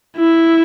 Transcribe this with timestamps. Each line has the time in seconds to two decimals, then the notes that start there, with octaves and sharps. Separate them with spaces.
0.16 E4